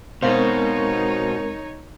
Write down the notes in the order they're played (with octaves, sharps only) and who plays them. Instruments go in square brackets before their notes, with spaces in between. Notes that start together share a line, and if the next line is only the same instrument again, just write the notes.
[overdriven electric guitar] B2 [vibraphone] G#3 C4 A#4 [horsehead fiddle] D#4 C#5 [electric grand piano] C5 F5